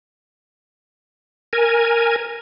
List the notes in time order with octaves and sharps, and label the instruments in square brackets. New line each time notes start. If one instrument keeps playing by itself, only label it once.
[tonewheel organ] A#4 G#5